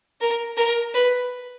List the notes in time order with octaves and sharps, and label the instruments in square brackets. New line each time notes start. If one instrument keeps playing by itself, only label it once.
[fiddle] A#4
A#4
B4